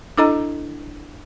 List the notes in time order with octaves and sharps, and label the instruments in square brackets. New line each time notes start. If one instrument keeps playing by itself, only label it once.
[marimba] D4 E4 A4 D#5 A#5